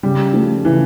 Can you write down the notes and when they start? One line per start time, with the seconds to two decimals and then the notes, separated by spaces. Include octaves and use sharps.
0.03 C#3 G3
0.33 F3 A3
0.64 C#3 E3